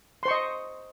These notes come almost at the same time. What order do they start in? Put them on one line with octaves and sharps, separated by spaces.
C6 C5 C#6 D#5